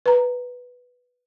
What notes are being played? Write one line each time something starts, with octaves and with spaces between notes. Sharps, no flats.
B4 A#5